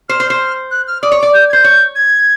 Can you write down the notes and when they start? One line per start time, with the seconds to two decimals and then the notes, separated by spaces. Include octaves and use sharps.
0.09 C5 F6
0.20 C5
0.30 C5
0.71 F#6
0.88 F6
1.02 D5 D#6
1.12 C#5
1.19 D5 D6
1.33 G6
1.50 G#6
1.53 C5 G6
1.64 C#5
1.96 G#6